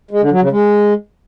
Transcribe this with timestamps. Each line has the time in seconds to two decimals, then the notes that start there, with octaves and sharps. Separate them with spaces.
0.11 G#3
0.21 D3
0.31 F#3
0.41 C#3
0.51 G#3